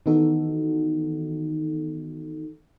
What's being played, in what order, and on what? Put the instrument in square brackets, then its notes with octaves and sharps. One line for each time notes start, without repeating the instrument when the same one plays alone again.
[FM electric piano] D#3 E3 B3 D#4 F#4 A4